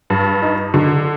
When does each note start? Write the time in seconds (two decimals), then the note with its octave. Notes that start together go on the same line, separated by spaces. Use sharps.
0.10 G2
0.42 D#4
0.74 D3